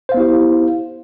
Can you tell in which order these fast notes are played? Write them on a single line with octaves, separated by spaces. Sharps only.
C5 F5 B3 E4 G4